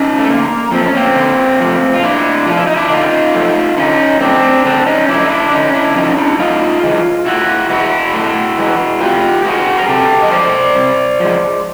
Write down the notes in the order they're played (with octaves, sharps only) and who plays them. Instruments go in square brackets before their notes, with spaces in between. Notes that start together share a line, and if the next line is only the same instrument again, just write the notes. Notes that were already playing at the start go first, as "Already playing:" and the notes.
Already playing: [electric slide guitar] C#4 D#4
A3
D3 A#3
F3 A3 C4
C#4
A#3 C4
D3
F3 A3
F4
D3 D4 E4
F3 F4
A3
E4
D#4
D4 E4
D3 D#4 F4
F3 A3
D3 C#4 D#4
F3 A3 C4 D4
D3 C4 D4
C#4 D#4
F3 A3 D4 E4
D#4
D4 E4
D3 C#4 D#4
D4 E4
F3 A3 C#4 D#4
D4 E4
A2 D#4 F4
E3 G#3
A2 E4 F#4
E3 G#3 E4 F#4
A2
E3 G#3
A2 F4 G4
E3 G#3 F#4 G#4
A#4
C3 G4 A4
D#5
F3 G#3 C5 D5
C3
F3 G#3